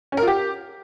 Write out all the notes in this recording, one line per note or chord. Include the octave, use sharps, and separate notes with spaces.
C#4
A#4
F4
G4